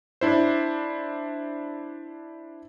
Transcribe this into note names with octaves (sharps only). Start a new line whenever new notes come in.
D4 E4 C5